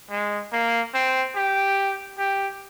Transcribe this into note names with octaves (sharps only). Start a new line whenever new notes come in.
G#3
A#3
C4
G4
G4